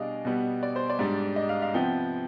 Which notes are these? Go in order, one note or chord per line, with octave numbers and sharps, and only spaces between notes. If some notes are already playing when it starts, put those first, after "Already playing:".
Already playing: B2 G3 D4 G#4 D5 D#5 F5
B2 G3 B3
D5
C5
D5
G#2 G3 D4
D#5
F5
F5
C3 F3 B3 G5